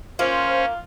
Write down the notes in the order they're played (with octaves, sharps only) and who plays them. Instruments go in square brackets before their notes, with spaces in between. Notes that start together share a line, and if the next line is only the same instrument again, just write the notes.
[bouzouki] A#3 [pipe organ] C#4 [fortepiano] F4 [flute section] C5